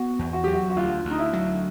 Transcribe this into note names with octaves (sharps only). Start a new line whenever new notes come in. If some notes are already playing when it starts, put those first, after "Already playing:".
Already playing: B3 F#4
E2
F#4
F#3 G4
F#4
F#4
D2 F4
D2
D#4
E4
F#3